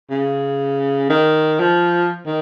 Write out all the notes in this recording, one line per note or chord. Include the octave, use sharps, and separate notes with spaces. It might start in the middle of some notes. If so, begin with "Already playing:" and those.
C#3
D#3
F3
D#3